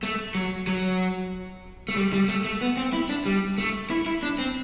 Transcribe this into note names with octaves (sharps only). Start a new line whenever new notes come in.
A3
F#3
F#3
A3
G3
G3
A3
A3
B3
C4
E4
D4
G3
A3
E4
E4
D4
C4